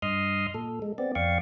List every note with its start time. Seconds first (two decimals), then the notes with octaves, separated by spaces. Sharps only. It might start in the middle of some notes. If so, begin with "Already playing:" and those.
0.02 G2 D#5 C6 D#6 F6
0.54 A#2 A4
0.82 G#3
0.98 B3 C4 D5
1.15 F2 D5 F5 G5 C#6